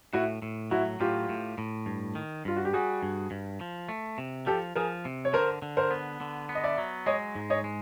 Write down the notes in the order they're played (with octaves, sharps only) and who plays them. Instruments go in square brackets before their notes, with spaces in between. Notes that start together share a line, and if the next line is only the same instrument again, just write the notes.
[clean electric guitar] A2 [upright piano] E4 F#4
[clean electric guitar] A2
[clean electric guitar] F#3 [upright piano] E4 F#4
[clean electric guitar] A2 [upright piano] F4 G4
[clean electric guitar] A2
A2
G2
D#3
[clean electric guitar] G2 [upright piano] F4
[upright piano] F#4
G4
[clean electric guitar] G3 [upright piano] F#4 G#4
[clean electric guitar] G2
G2
F3
A3
C3
[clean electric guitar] F3 [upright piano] G4 A4
[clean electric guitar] F3 [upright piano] G#4 A#4
[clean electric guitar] C3
[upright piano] C#5
[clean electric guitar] D3 [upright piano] A#4 C5
[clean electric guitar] D3
[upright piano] A#4 C5
[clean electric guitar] B3
D3
B3
[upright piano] D#5
D5 E5
[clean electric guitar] F#3
[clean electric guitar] G#3 [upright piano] C#5 D#5
[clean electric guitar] G#2
[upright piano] C#5 D#5
[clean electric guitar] G#3